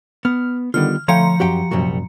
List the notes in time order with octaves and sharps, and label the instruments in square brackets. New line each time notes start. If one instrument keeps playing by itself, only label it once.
[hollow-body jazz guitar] B3 [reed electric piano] F6
[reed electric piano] D3 D#3 [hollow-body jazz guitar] G3 B3 F4 [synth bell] F6
[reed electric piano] D3 A3 [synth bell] F3 A#5 C#7 [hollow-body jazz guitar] C#5 F5 G5
[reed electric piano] F#2 F#3 [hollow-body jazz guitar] F#4 G4 G5
[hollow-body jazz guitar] C2 G3 F#4 [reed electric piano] F#2 A#2